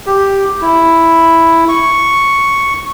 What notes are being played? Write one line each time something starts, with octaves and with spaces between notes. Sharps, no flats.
G4
E4
C#6